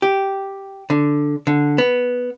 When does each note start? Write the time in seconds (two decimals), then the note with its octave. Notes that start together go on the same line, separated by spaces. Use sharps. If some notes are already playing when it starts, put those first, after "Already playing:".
0.02 G4
0.90 D3
1.47 D3
1.78 B3